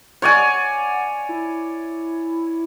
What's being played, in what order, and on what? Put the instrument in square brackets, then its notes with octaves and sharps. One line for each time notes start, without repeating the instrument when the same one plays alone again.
[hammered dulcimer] C#5 D5 G#5 [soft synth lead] F#5
[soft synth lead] E4